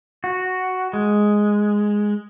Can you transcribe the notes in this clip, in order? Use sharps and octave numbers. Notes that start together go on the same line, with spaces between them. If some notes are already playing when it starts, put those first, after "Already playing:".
F#4
G#3